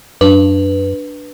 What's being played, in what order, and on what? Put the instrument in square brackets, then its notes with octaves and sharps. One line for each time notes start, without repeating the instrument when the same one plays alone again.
[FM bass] F#2 [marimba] D4 [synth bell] B4